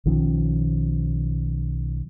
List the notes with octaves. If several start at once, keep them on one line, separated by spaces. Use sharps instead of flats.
B1 D#3 F3 C#4